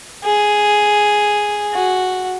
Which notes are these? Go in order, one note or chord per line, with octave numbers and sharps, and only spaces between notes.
G#4
F#4